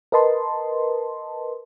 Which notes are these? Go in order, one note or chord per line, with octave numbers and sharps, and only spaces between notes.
A#4 B4 D#5 A5 C6